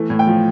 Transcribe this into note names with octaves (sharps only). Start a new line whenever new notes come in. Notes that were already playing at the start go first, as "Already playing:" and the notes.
Already playing: E3 A3
A2
G5
F3